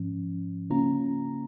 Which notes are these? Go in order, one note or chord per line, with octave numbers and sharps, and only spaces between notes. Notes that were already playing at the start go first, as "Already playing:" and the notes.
Already playing: G#2 F3 C#4
C#3 A#3 C#4 F4 A#5